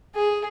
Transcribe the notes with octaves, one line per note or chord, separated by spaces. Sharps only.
G#4